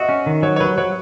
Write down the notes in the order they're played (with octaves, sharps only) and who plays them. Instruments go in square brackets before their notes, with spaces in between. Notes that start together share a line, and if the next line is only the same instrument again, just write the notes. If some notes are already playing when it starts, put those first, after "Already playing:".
Already playing: [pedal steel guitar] F#4 [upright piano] D#5 E5
[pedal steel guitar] C#4
D#3
[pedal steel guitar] F#3 [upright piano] C#5
[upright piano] C#5
[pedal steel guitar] F#3 [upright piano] B4
[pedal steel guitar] F#3 [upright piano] C#5